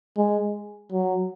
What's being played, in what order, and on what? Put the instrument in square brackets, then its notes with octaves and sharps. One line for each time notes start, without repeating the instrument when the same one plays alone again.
[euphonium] G#3
F#3